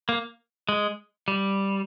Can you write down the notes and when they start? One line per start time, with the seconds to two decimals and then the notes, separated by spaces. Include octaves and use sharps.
0.09 A#3
0.69 G#3
1.28 G3